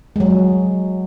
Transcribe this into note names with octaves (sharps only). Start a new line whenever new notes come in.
F#3 G#3